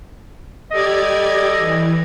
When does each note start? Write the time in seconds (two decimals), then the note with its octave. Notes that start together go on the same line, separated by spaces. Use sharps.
0.72 G3 G4 A4 D5 D#5 G#6
1.58 E3